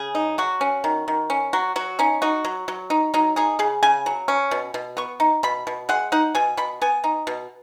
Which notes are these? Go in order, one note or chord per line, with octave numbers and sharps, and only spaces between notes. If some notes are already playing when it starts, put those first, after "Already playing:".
Already playing: C#3 G#4
D#4
F#3 F#4
C#4
D#3
D#3
C#4
F#3 F#4
F#3 F#4
C#4 D#4
D#4 F#4
F#3
F#3
D#4
F#3 D#4
D#4 G#4
C#3 G#4
C#3 G#5
F#3
C#4
B2
B2
B3 C#6
D#4
B2 B5
B2
G#3 F#5
D#4 F#5
B2 G#5
B2 B5
B3 G#5
D#4
B2